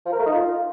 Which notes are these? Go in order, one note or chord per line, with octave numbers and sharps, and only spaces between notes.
F3
A#4
A3
D#4
F4